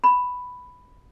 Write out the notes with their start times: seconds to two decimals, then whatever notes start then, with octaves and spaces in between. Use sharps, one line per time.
0.04 B5